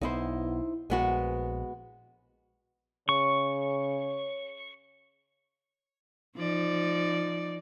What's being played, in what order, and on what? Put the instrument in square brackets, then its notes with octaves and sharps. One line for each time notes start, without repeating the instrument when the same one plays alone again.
[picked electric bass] B1 B3 [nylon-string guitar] D#4 E4 C5
[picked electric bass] A#1 [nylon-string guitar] G#3 B3 F#4
[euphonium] C#3 [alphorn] C#5 [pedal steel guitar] C#6
[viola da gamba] F3 D#4 D5